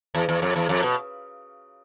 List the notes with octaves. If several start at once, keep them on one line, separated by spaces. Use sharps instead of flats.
E2
E2
F2
E2
F2
B2